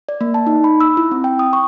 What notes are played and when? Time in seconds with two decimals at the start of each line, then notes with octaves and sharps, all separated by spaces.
0.09 D5
0.21 A#3
0.34 A5
0.47 D#4
0.64 B5
0.81 E6
0.97 E4
1.11 C4
1.24 G5
1.39 D#6
1.53 C#6